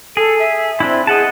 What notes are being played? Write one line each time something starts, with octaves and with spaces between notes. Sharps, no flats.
G#4 A4
E5
C4 D4 E4
G#4 D#5 F#5 A5